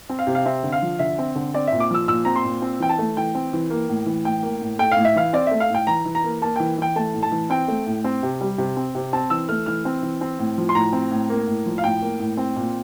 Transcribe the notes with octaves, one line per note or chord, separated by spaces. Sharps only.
C4
F5
C3
F5
C4 E5
D3
F5
F3
D3 E5
C4
D3
C4 D5
A#2 E5
D6
F3 E6
A#2 E6
C4 A#5
C6
A#2
C4
E3 G5
A5
A3
E3 G5
C4
E3
A#3
A2
E3
A2 G5
A#3
A2
A3 G5
F5
A2
E5
E3 F5
C4 D5
A3 E5
F5
A2 G5
E3 A#5
E3
A#5
A#3
A#3 A5
E3 G5
E3 G5
A3 A5
A2
A5
E3
C4 G5
A3
A2
C4
C3
G3
C3
C4
C3
C4 A5
E3 E6
A3 F6
E3 F6
C4
E3
C4
A2
F3
C6
A2 A#5
C4
A2
A#3
A2
F3
F5
A2 G5
A#3
A2
C4
A#2